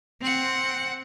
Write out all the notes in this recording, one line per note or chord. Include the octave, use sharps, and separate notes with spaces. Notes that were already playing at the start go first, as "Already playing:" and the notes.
C4 F#5